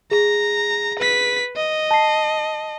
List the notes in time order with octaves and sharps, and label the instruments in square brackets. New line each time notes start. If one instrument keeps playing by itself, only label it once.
[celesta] G#4 [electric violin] A#5
[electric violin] B4 B6
D#5
[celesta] A5 C7